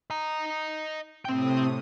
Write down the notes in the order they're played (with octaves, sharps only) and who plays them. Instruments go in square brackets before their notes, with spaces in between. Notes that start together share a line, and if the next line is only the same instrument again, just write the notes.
[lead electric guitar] D#5 A#5
[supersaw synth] A2 C3 D#6 [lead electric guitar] C4 G5